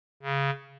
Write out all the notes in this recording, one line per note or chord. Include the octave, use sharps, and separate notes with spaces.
C#3